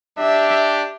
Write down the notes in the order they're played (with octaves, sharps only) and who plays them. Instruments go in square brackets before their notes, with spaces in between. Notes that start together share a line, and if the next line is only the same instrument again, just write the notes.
[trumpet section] D4 G4 [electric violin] E5